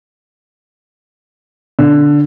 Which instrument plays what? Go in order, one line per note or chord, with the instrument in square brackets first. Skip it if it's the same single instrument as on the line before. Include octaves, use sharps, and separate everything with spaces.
[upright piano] D3